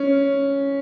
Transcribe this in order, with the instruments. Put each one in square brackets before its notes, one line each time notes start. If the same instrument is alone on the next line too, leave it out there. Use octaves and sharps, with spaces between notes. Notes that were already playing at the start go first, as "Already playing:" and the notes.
Already playing: [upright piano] C#4